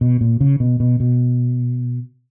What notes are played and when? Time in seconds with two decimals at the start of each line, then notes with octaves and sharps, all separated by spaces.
0.01 B2
0.21 A#2
0.41 C#3
0.60 B2
0.80 B2
1.00 B2